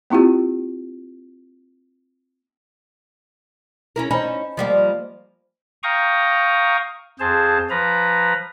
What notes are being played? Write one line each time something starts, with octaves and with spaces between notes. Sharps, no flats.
A#3 C4 E4 F4 G4
C#4 E4 A#4
C#4 D#4 C5 D#5 G#5 A5 B5
F3 G3 A#3
F5 G5 A#5 C#6 D#6
F2 G#4 C5 A5
F3 B4 A#5